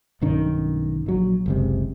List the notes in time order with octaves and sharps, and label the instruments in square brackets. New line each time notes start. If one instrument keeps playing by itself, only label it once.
[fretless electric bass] B1 G2 D#3 C#4
A#1 F#3
F#1 C#2 C3